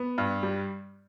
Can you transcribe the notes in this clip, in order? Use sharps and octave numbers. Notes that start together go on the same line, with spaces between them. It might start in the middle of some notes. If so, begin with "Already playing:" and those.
Already playing: B3
G2
G3